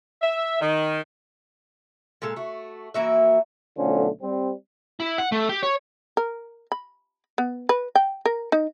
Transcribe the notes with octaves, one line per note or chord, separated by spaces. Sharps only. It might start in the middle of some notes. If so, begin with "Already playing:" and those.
E5
D#3
A#2 G#3 A4 A5
A3 F#4
E3 A#3 F#4 E5
B1 D3 A3 C#4 F4 C5
G3 C4
E4
F#5
A3
G4
C#5
A#4
B5
B3
B4
G5
A#4
D#4